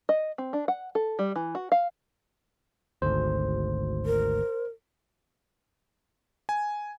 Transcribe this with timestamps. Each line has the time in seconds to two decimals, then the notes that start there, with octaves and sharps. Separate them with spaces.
0.09 D#5
0.38 C4
0.53 D4
0.68 F#5
0.95 A4
1.19 G3
1.36 E3
1.55 F#4
1.72 F5
3.02 G#1 D2 C5
4.06 A#4
6.49 G#5